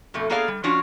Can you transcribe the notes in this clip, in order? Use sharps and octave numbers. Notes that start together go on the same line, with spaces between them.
F2 B2 A3
A#3 B3 G#4 A4 D5 F5
G3
F3 C#4 D4 F4 F#4 C#5